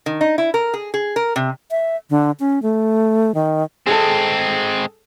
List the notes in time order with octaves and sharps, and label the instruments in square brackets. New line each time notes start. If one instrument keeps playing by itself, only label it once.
[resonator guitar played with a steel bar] D#3
D#4
E4
A#4
G#4
G#4
A#4
C3
[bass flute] E5
D3
C#4
A3
D#3
[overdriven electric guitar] G#3 C4 [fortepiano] G#4 A4